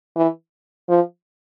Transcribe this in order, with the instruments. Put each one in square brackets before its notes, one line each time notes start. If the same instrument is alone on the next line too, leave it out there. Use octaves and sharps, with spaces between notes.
[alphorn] E3
F3